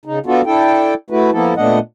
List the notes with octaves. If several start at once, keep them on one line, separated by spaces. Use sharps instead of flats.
C#3 D#4
B3 D4 F4 F#4 A4
D4 E4 A4 G5
A3 E4 F#4 B4
F3 A#3 B3 E4 A4
A#2 A3 B3 D4 D#5 F#5